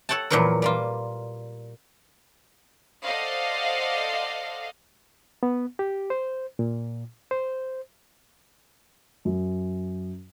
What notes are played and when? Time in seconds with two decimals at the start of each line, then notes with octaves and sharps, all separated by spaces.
0.09 A4 C#5 F#5 G5 A5
0.30 E2 A#2 F3 F#3 B3 A#4
0.62 G3 A#3 F4
3.04 A4 C5 D5 D#5 F5 F#5
5.43 B3
5.79 G4
6.10 C5
6.59 A#2
7.31 C5
9.25 F#2